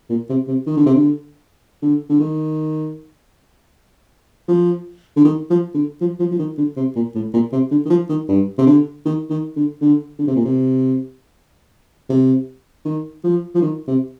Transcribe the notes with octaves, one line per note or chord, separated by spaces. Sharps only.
A#2
C3
C3
D#3
D3
C3
D3
D3
D3
D#3
F3
D3
D#3
F3
D3
F3
F3
F3
D#3
D3
C3
A#2
A2
A#2
C3
D3
D#3
F3
D#3
G2
C3
D3
D#3
D#3
D3
D3
D3
C3
A#2
C3
C3
D#3
F3
F3
D#3
C3